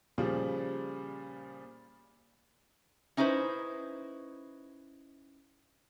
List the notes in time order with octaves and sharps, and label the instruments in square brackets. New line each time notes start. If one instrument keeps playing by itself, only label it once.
[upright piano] A#2 C#3 F3 G3
[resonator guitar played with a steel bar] C#4 D#4 E4 B4 C5